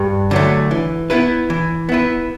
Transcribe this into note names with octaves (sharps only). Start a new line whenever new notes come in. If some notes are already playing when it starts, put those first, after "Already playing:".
Already playing: G2
D3 F#3 A3
E3
B3 E4 B4
E3
B3 E4 B4